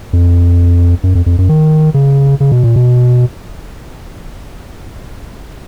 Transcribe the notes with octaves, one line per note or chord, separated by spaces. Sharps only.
F2
F#2
F2
F2
F#2
D#3
C#3
C#3
B2
A#2
B2